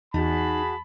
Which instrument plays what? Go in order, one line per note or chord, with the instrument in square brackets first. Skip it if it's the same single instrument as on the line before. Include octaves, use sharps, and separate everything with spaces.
[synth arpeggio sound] E2 [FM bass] D#4 [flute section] F#4 G#4 [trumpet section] A5 B5